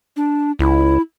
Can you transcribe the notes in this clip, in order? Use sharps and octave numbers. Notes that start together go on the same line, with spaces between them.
D4
C#2 E4